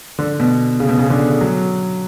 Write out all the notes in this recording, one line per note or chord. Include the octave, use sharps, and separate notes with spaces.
D3
B2
C#3
B2
C#3
D3
F#3